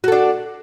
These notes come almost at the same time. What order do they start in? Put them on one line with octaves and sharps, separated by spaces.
F#4 A4 D4